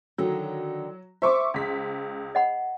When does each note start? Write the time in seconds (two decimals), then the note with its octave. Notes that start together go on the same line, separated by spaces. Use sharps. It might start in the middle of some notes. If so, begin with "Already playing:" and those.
0.18 D3 D#3 F#3
1.22 C5 E5 C#6 D6
1.54 C#2 B6
2.35 D#5 F#5 B5